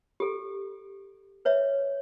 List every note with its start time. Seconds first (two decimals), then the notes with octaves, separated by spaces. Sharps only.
0.20 G4 A4
1.45 B4 C#5 E5